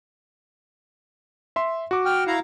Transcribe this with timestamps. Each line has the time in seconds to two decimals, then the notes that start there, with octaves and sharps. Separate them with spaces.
1.56 E5 C6
1.91 F#4 D6
2.05 G5 F6
2.27 E4 F5 A#5